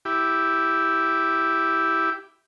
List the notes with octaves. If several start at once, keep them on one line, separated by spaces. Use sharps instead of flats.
E4 G4